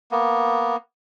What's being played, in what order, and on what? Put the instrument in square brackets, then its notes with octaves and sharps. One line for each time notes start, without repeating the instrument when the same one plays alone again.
[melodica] A#3 B3